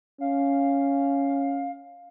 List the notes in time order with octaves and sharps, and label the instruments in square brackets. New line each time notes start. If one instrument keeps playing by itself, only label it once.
[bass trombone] C#4 [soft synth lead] F5